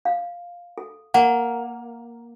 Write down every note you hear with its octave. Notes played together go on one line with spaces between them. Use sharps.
F5
A4
A#3 F#5